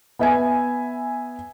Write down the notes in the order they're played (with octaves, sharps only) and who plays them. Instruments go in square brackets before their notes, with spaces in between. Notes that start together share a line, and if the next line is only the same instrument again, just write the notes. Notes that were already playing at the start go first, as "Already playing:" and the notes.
[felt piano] B3 E5 G#5